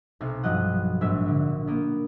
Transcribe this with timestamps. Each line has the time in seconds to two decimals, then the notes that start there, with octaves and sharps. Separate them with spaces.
0.20 B1 C3
0.43 G2 F3 F#3 D#5 F#5
1.01 A#1 G#2 E5 B6
1.28 D3
1.67 A#3 B3